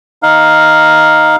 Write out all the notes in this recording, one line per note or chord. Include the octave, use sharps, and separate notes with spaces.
D#4 F5